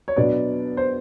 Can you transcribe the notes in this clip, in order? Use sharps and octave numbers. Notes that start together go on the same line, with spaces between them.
C#5
B2 F#3 B3 D4 D5
C5